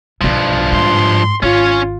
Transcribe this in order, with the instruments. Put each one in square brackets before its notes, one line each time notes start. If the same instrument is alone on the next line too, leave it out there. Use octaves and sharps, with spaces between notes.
[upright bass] B1 B2 [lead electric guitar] G2 F3
[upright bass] G#2 [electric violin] C6
[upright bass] G#1 [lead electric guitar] C#4 C#5 [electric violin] F4